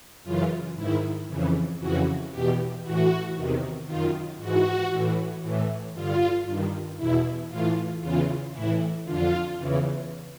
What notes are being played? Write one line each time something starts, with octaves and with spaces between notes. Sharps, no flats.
F#2 C#3 E3 F4
G#2 D#3 E4
F2 C#3 E3
F2 C#3 E3 F#4
E2 B2 G4
A2 E3 F#4
E2 C3 D#3
F#2 D#3 F4
G#2 E3 F#4
A2 E3
A2 E3
G2 D3 F4
G2 D#3
E2 B2 E4
A2 E3 F4
E2 C#3 E3 F4
A2 E3 E4
F2 D3 F4
E2 C#3 E3